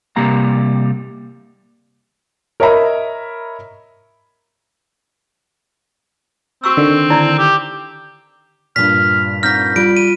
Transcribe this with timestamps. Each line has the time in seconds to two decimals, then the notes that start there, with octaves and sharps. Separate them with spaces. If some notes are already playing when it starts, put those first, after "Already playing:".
0.16 C3 G3 A#3 A#5
2.60 A#4 C#5 D#5 E5 A#5 B5
6.64 C4 F#4 C#6 E6
6.77 D3 D#3
7.10 D#4 E4 D5
7.38 G4
8.76 G2 A#2 F6 B6
9.43 C4 D#4 F6 G6 A#6 B6
9.76 G3 F4 D7
9.96 D#7